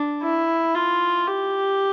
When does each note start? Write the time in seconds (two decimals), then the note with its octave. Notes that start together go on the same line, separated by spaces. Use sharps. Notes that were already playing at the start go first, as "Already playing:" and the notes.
Already playing: D4
0.23 E4
0.75 F4
1.28 G4